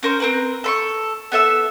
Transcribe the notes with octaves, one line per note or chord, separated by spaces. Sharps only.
C#4 A#4 C5
C4 A#4 B4
A4 B5 C#6
B3 A4 E5 E6